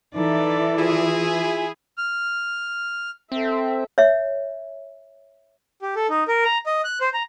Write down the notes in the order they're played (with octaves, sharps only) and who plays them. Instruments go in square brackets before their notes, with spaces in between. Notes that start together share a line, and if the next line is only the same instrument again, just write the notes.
[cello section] E3 [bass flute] D#4 [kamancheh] A4 D5
[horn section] E4 G#4 [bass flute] F4
[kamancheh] G#5 B5
[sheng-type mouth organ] F6
[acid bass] C4 [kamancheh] A4 E5
[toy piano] C#5 E5
[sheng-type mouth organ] G4
A4
D#4
A#4
A#5
D#5
F#6
C5
A#5